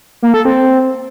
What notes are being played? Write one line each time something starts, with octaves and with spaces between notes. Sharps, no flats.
A#3
A4
C4